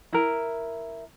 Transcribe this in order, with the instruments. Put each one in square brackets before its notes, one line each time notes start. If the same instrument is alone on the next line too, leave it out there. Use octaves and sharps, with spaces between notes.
[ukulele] E4 A#4